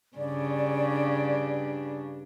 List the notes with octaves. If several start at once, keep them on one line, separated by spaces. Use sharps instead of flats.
G2 C#3 D4 D5